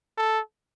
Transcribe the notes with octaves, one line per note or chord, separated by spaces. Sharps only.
A4